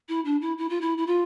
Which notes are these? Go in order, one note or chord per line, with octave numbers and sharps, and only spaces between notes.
E4
D4
E4
E4
F4
E4
E4
F4